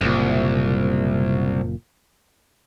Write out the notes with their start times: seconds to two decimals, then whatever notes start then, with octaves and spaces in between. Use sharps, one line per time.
0.01 F#1 C2 A#2